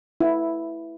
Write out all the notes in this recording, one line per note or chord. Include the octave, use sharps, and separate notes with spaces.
E4